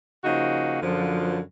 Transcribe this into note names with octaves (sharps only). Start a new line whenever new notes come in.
C#3 F3 A#3 D#4 F#4
F#2 D3 F3